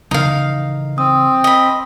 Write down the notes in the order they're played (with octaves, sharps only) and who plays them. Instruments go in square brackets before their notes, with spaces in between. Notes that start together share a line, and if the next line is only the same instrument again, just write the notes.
[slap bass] C#3 E3 F3 [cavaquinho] D#4 F5
[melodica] C4 [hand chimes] D#6
[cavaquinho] D#5 B5